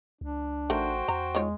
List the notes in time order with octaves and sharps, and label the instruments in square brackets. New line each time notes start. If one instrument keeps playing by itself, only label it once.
[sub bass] C#2 [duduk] D4
[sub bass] A1 [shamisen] A3 D#4 A#4 [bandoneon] F#4 C5 G5
[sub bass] E2 [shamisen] A#5
[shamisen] D#3 F4 C#5 [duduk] G#3